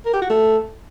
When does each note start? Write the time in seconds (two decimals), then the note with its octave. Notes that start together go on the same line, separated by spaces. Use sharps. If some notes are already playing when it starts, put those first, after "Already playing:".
0.06 A#4
0.14 G4
0.22 F#4
0.30 A3